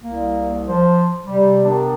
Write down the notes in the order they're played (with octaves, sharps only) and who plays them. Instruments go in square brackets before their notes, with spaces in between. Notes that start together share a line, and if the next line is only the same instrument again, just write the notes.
[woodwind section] C2 [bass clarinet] A#3
[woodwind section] F3 [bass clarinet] C5
[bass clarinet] C3 [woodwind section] G3
[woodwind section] D#3 B3 D4